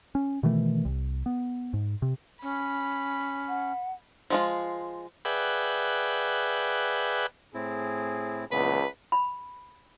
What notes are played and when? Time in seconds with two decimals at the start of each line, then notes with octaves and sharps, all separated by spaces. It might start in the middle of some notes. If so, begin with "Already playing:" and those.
0.15 C#4
0.43 B2 D#3 E3 A3
0.85 C2
1.26 B3
1.74 G#2
2.02 C3
2.43 C#4 B5
3.49 F#5
4.30 F3 G#3 F4
5.25 G#4 B4 D5 E5 F#5 G5
7.54 A2 C4 E4 G#4
8.52 C#2 A#2 E3 B3 B4
9.12 B5